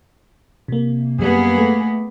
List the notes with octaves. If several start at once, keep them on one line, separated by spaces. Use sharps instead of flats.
C3 A#3
F#2 G3 A#3 B3 G#4
A3